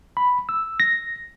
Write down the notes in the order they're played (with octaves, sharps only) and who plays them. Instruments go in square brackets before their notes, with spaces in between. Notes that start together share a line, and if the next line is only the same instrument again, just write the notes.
[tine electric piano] B5
E6
A#6